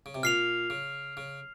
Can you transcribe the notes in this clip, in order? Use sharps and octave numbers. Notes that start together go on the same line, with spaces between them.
C#3
C3
A#2 F6 C7 F7
C#3
C#3